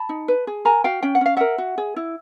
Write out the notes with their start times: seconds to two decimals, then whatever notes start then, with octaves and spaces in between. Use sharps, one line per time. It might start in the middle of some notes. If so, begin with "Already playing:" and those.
Already playing: A5 B5
0.09 D#4
0.28 B4
0.47 G#4
0.65 A#4 G#5 A#5
0.84 F#4 F5 G5
1.03 C#4 G5
1.15 F#5
1.21 C#4 F5
1.37 A#4 E5 F#5
1.58 F#4
1.78 G#4
1.96 E4